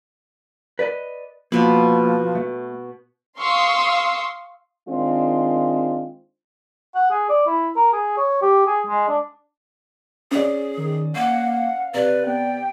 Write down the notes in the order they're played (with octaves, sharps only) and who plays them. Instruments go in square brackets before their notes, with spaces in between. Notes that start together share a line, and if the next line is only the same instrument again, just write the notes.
[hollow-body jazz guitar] B4 D5 D#5
[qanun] B2 B4 [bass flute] F3 [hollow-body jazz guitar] A#3
[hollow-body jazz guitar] A3
[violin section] F5 C6 C#6 D#6 E6
[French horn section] D#3 G#3 C4 D4 F4
[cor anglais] F#5
G#4
D5
E4
A#4
G#4
C#5
G4
G#4
G#3
D4
[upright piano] C#4 D5 [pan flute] G#4
[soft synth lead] D#3
[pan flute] A#3 [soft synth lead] F5 [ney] F#5
[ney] F#5
[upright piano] C3 [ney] B4 [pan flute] D5
[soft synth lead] B3 [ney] G5